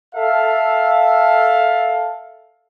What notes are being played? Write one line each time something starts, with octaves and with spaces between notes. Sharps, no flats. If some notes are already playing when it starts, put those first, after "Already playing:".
A4 E5 F5